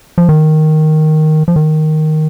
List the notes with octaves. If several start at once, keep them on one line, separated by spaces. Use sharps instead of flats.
F3
D#3
F3
D#3